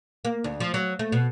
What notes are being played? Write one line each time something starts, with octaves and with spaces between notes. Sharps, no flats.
A#3
D2
F3
F#3
A3
B2